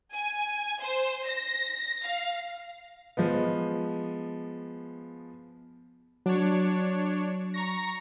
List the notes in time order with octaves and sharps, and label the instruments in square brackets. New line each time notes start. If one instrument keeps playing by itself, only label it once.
[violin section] G#5
C5
A#6
F5
[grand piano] F3 G#3 B3
[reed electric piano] F#3 [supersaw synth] D4 C#5
[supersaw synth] A#5 C#6 A#6